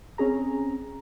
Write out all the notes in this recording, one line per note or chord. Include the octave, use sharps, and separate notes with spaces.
C4 C#4 G#4 A#5